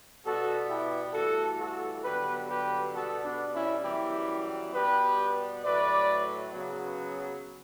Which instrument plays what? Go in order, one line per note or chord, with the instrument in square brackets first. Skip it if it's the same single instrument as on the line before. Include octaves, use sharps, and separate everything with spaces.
[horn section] B2 G3 B3 F#4 A4
E4 G4
G2 E3 A3 F#4 A4
F#4 A4
G2 D3 F#3 B3 G4 B4
G4 B4
B2 G3 B3 F#4 A4
B3 D4
C#4 E4
F#2 E3 G3 B3 E4 G4
B2 G3 B3 G4 B4
A2 F#3 A3 B4 D5
C#3 F#3 B3